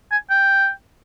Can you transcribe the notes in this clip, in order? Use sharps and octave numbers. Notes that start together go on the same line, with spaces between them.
G#5
G5